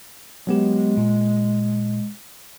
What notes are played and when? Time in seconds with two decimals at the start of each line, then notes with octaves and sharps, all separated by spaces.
0.47 F#3 G#3 B3 G4
0.97 A#2